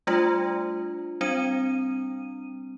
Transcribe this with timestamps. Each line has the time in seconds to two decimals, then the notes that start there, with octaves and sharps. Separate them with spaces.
0.07 G3 A3 D4 F4
1.21 G3 C4 D4 D#7